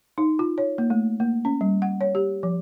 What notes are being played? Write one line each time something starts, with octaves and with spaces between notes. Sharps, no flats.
D#4
F4
C#5
A#3
A3
A#3
C#4
G3
F#5
C#5
G4
F3